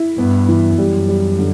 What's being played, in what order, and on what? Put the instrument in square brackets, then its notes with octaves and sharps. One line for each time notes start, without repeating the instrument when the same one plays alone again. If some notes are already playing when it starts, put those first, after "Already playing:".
Already playing: [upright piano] E4
[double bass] G2 [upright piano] B3
[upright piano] E3
[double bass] F#2 [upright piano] G3
[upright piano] G3
D3